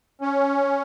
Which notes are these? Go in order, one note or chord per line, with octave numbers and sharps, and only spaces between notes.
C#4